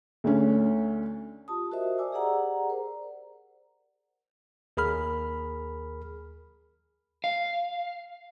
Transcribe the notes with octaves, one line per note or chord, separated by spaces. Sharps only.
D2 D3 C#4
F4 G4 A5 D#6
F#4 A#4 C5 D#5 E5
C5 D5 G#5 D6 E6
G4 G#4 D5 F#5 A#5
A#4 C5
D#2 G#4 A#4 B5 F6
F5